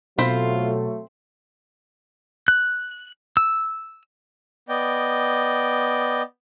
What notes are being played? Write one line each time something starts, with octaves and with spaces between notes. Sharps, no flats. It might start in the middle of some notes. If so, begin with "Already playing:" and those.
B2 F#3 A3 C4 F4 C5 B5
F#6
E6
B3 D5 D#5 G5